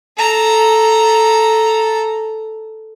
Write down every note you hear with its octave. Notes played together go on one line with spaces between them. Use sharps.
A4 A#5